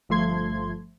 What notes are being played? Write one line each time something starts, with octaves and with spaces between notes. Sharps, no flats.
G1 F3 A3 C6 G#6